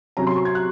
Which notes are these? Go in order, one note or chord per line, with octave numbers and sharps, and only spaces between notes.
C3 F#3 C#4 A#5
C6
C#6
G#6
F#6